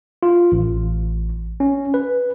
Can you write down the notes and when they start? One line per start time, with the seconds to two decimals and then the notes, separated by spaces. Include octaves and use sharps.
0.23 F4
0.52 A1
1.60 C#4
1.94 B4